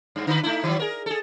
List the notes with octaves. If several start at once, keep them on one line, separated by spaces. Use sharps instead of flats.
G2
D3 B4
A3 D#4 E4
D#3 F3 F#3
G#4 A#4
G#4 A4